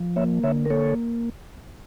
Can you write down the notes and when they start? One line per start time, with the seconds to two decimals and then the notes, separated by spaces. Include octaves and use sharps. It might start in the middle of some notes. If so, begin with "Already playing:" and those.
Already playing: F3
0.16 A#3 C#5 E5
0.43 D3 C#5 E5
0.65 A#4
0.70 A#3 A4 C#5